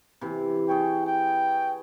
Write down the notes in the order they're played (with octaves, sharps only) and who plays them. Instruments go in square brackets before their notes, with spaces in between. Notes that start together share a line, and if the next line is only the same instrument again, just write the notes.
[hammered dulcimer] C3 E3
[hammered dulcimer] G#4 C#5 [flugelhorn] G5
[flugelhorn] G5